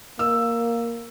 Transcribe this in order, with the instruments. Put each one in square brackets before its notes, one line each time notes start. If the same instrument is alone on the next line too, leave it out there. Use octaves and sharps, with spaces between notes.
[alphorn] A#3 [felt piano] E6